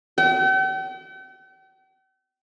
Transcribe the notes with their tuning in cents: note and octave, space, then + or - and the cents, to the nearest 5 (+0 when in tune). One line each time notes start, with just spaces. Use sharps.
G5 -45